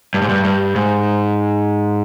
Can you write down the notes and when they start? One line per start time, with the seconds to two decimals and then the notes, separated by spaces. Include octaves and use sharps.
0.14 G2
0.22 G#2
0.29 G2
0.45 G2
0.76 G#2